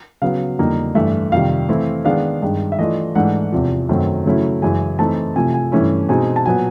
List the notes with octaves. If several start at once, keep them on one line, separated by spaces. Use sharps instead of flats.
C#3 F#3 B3 F5
F2 D3 G3 A#3 D#4
G2 E3 A3 E5
F2 C3 D#3 G3 F5
E3 A3 C4 E4
D#3 G#3 B3 D4 F5
G2 D#3 G#3
E5
E3 A3 D4 F4 D#5
G#2 E3 A3 D4 F#5
E2 C3 F3
F#2 D#3 F#3 A3 C4
C#3 F#3 A3 C#4 E4
F#2 C#3 E3 G#3 G#5
E3 A3 C4 D#4 A5
C3 F3 A3 G#5
G#5
G2 E3 A3 C#4 E4
B2 G#3 C4 D#4 G#5
A5
A#2 F#3 B3 G#5